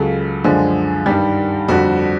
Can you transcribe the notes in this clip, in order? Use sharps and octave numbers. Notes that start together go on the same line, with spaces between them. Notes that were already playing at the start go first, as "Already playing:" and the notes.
Already playing: C#2 C#3 F#3 A4
F#2 D3 F3 G#3
G2 D#3 G3 G4
F2 D3 G3 F#4